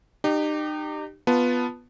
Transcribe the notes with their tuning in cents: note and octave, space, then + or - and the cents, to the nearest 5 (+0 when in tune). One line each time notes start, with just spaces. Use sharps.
D#4 -35 G4 +0
B3 +0 F4 +0 A5 +0